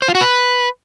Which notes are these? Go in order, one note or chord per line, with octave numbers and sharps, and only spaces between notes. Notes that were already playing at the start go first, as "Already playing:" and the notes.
C5
F4
F#4
B4